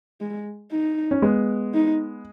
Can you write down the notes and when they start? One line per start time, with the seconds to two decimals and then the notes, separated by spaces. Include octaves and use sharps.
0.21 G#3
0.72 D#4
1.11 C#4
1.22 G#3 B3
1.74 D#4